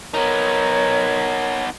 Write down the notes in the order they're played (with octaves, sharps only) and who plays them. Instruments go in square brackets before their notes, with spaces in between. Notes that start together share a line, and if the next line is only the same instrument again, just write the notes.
[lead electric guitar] B3 D#4 [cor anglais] A#4 [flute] C#5